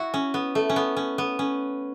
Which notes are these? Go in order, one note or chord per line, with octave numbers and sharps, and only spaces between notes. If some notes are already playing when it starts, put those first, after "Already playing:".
Already playing: E4 F#4
C#4
B3
A3
C#4
B3
C#4
B3
C#4